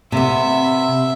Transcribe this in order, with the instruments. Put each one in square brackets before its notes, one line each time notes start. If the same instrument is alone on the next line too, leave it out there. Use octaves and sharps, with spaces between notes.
[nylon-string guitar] C3 B3 [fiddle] E5